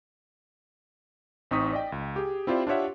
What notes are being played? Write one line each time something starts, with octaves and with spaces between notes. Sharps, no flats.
A1 C4 D#4 C#6 D#6 B6
D5 D#5 G5
C#2
G4 G#4
C4 E4 F4 G4 C5 D5
D4 F4 G4 C#5 E5 F#5